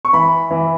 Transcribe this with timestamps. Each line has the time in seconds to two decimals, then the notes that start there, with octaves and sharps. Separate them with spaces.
0.05 C#6
0.13 E3 B5
0.51 E3